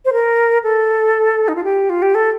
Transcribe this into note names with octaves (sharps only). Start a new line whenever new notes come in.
C5
A#4
A4
D#4
F4
G4
F4
G4
A4